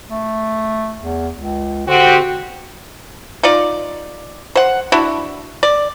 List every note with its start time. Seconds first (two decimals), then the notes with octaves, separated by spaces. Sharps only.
0.11 A3
0.99 E2
1.35 C#2
1.87 D3 C4 F#4 G4
3.43 D#4 F4 D5
4.55 C5 F#5
4.92 D4 E4 F#4
5.63 D5